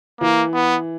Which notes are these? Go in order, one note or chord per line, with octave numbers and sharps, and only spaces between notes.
E3 A#3
B3